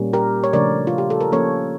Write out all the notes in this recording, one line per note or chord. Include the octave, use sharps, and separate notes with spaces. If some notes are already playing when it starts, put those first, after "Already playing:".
Already playing: A#2 G3 A#3 C#4
G4 A#4
C#5
C#3 F3 A3 D4 A#4 D5
F4
G4
A4
A#4
F3 A#3 C#4 A4 C#5